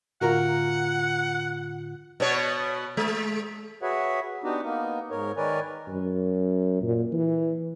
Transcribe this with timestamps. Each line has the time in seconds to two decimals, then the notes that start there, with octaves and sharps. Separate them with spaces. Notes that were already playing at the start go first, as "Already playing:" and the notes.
0.21 A2 D3 F4 F#4 A#4 F#5 A#5
2.20 B2 B3 C#5
2.97 G#3
3.82 F#4 G#4 B4 C#5 E5 F#5
4.44 B3 D4 D#4 F#4 G4
4.63 A#3 B3 D#4
5.11 G#2 A#4 C#5
5.37 D#3 A#4 B4 C#5 D5 G#5
5.88 F#2
6.82 A#2
7.12 E3